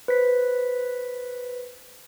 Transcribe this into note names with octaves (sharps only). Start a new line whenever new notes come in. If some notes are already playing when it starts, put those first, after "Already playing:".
B4 C5 B6